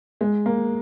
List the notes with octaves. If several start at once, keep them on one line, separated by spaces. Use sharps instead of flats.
G#3
A#3